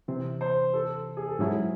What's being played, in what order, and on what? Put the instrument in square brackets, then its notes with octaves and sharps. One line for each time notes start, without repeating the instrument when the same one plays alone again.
[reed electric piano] C3 E3 C4
[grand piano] C5
A4
G#4
A4
[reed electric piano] G#2 F#3 C#4 E4 [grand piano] G#4